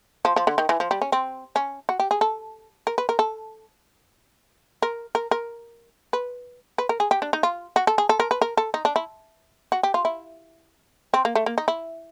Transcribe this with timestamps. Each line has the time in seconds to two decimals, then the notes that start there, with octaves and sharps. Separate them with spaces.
0.25 F3
0.36 F3
0.47 D3
0.58 D#3
0.69 E3
0.80 F3
0.91 G3
1.02 C#4
1.12 C4
1.56 C#4
1.89 F#4
2.00 G4
2.11 G#4
2.21 A4
2.87 A#4
2.98 B4
3.09 A#4
3.19 A4
4.82 A#4
5.15 A#4
5.31 A#4
6.13 B4
6.78 B4
6.89 A#4
7.00 G#4
7.11 G4
7.22 D4
7.33 D#4
7.43 F4
7.76 F#4
7.87 A4
7.98 G#4
8.09 A4
8.20 A#4
8.31 B4
8.41 A#4
8.57 A4
8.74 D#4
8.85 D4
8.96 E4
9.72 F#4
9.83 G4
9.94 F4
10.05 E4
11.14 C4
11.25 A#3
11.35 A3
11.46 A#3
11.58 D#4
11.68 E4